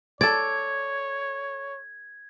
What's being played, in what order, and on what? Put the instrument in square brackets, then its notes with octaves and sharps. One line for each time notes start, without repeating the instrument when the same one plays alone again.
[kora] A4 D5 [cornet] C#5 [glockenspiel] G#6